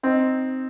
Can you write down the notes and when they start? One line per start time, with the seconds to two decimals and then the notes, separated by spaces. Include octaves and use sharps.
0.03 C4 D#4